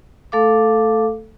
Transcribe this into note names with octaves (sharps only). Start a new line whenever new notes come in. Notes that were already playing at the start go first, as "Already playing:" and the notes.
A3 A4 F5 D6